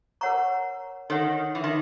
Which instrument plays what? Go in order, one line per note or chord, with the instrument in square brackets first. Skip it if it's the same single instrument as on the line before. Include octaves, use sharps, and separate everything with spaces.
[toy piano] A#4 C#5 F#5 A#5 C#6
[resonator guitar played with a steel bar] D#3 [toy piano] A4 C#5 F#5
[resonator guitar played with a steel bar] E3
D#3